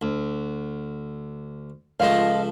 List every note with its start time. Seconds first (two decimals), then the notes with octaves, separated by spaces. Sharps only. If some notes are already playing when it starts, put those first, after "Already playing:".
0.01 D2
2.00 C#2 F3 A3 D#5 F5